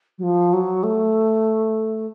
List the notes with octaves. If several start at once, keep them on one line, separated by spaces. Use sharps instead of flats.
F#3
F3
F#3
A3